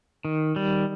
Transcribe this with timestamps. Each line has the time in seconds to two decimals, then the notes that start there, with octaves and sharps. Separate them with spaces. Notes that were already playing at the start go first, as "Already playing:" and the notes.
0.25 D#3
0.56 G3